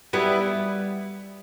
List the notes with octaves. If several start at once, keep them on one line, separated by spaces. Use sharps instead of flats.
G3 B3 E4 B4